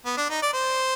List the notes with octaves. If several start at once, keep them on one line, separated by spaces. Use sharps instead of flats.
B3
D4
D#4
D5
C5